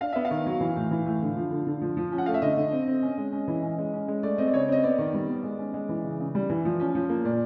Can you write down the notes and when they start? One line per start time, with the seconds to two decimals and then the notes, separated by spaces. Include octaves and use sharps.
0.01 D4 F5
0.13 B3 E5
0.25 F5
0.31 D#3
0.46 F#3
0.61 E3
0.76 A2
0.91 E3
1.06 A2
1.22 D3
1.37 F3
1.51 D3
1.67 D3
1.82 F3
1.97 F3
2.12 C#4
2.18 F#5
2.26 A3 F5
2.34 E5
2.42 D3 D#5
2.57 D3
2.72 C4
2.87 C4
3.03 C#4
3.18 G#3
3.33 C#4
3.48 E3
3.63 C#4
3.78 G#3
3.93 C#4
4.08 G#3
4.23 A3 D5
4.38 C4 D#5
4.48 D5
4.53 C#3 C#5
4.68 C4 D#5
4.83 B3 D5
4.98 D#3
5.14 G3
5.29 B3
5.44 G#3
5.59 C#4
5.74 G#3
5.89 E3
6.04 C#3
6.20 C#3
6.35 G3
6.50 E3
6.65 F3
6.80 C#4
6.95 F3
7.10 A#3
7.25 A#2 D5